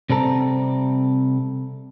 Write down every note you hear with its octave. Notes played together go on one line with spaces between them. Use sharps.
C3 G3 C4 A4 A#5